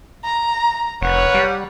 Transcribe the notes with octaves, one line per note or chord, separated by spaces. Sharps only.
A#5
F1 A#4 B4 C#5 F#5
G3